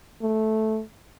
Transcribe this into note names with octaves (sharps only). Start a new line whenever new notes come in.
A3